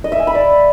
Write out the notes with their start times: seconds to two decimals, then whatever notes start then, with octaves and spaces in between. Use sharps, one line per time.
0.04 D#5
0.12 E5
0.20 G#5
0.27 B5
0.35 D5